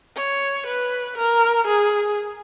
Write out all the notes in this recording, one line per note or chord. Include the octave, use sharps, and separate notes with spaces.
C#5
B4
A#4
G#4